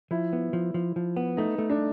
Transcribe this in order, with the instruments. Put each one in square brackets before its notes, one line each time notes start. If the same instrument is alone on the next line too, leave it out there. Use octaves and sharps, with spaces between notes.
[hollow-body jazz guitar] F3 [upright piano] E4
[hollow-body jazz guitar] B3
F3
F3
F3
B3
[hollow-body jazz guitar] A3 [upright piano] D#4
[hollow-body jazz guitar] A3
[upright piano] D4